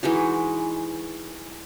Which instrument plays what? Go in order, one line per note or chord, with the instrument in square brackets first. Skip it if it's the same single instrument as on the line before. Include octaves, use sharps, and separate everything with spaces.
[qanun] E3 G#3 D#4 F#4